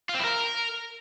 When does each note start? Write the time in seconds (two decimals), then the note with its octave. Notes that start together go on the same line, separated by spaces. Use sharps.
0.09 F4
0.14 C4
0.19 E4
0.24 A#4